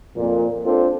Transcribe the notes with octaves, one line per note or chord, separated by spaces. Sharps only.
F2 A#2
C4 D4 F4 A4 C5